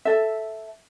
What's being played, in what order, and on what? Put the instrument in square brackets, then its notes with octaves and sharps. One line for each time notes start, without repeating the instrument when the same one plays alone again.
[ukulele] A4 E5